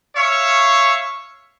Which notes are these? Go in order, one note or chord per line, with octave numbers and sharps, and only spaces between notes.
C#5 E5 F5 C#6